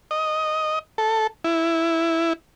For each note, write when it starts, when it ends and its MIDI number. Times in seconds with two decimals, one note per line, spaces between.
0.11 0.79 75
0.98 1.27 69
1.44 2.33 64